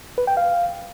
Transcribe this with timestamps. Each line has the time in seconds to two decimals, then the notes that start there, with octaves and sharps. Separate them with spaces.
0.18 B4
0.27 G5
0.37 F5